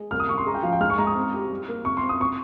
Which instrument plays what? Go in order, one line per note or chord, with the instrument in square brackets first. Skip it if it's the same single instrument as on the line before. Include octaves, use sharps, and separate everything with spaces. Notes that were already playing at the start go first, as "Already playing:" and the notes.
Already playing: [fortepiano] G#3
[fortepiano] C2 [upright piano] F6
[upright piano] D#6
[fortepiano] C2 [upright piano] C#6
[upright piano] C6
[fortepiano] G#3 [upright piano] A#5
[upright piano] G5
[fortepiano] F3 [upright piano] F5
[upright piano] G5
[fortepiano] G#2 [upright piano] F6
[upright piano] C#6
[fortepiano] G#2 [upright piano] A#5
[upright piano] D#6
[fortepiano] C4
G4
G3
A#3
[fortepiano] C3 [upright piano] C#6
[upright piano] C6
[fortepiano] C4
[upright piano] D#6
[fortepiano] C4 [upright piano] C#6